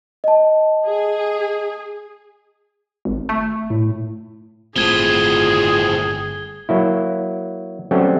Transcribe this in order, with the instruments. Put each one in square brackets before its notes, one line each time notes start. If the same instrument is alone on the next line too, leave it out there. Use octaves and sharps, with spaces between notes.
[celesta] D#5 A5
[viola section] G#4
[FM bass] G#1
A3
[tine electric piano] A2
[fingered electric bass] G1 A3 C4 [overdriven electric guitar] A2 F3 [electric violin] G#4 [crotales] G#6 G7
[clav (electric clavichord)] F#3 A#3 E4
F#3 G3 A3 C4 C#4